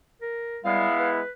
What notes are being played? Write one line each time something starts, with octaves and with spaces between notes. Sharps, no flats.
A#4
G3 G#3 B3 E4 F5
B4